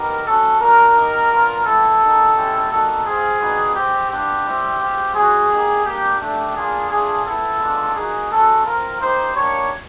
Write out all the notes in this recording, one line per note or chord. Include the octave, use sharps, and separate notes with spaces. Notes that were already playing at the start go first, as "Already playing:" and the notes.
Already playing: B3 D#4 G4 A#4
A3 C#4 F#4 A4
A#3 D4 F#4 A#4
A#3 D#4 G4
B3 D4 F4
G3 B3 E4 G4 A4
A#3 D#4 G4
G#3 C#4 E4 G4
G3 A#3 D#4 F#4 A4
C4 F4 G#4
G3 B3 D#4 F#4
G#3 C4 F4 G4
B3 D4 F4 G4
G3 C4 E4
G#3 C4 F4
G#3 C#4 F#4 G#4
A#3 D#4 G4
G3 A#3 D4 G4
A3 D4 G4
A#3 D4 F4 G#4
A3 D4 F4 G#4
B3 E4 G4 A4
G#3 B3 D4 F4
A#3 D#4 F#4 G#4
G#3 C#4 F#4 A4
C4 F4 A#4
A#3 D#4 G4 C5
A#3 D4 G4 C#5